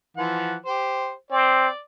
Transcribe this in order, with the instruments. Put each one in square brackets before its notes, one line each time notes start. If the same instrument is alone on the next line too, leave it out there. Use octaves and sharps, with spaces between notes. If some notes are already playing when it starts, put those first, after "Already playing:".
[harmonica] E3 F3 F#5
G4 C5
[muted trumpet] C4 [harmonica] D5